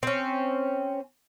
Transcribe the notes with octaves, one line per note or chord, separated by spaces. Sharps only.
C4 C#4